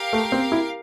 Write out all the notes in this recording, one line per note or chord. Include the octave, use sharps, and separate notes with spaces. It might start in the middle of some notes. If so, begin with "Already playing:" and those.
Already playing: G4 A#4 F5
A3
C4
E4